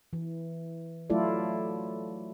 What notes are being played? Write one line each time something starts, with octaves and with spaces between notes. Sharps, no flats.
E3
F#3 A3 E4 F4 A4 D5